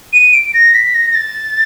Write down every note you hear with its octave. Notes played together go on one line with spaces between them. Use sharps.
D#7
D7
A#6
B6
A#6
A#6
A6